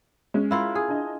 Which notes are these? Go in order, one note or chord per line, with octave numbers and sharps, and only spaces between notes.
G#3 C#4
E4 F4 A#4
G#4
D4 D#5